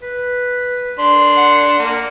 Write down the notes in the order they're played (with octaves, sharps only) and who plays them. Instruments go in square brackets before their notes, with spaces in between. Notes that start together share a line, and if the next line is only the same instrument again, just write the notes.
[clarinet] B4
[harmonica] D4 C6
[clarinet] F#5
[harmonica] A#3